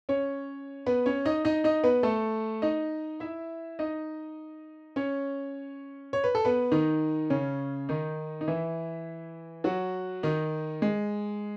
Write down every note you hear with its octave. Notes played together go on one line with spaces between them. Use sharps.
C#4 C#5
B3 B4
C#4 C#5
D#4 D#5
D#4 D#5
D#4 D#5
B3 B4
A3 A4
D#4 D#5
E4 E5
D#4 D#5
C#4 C#5
C#5
B4
A4
B3 B4
D#3 D#4
C#3 C#4
D#3 D#4
D#4
E3 E4
F#3 F#4
D#3 D#4
G#3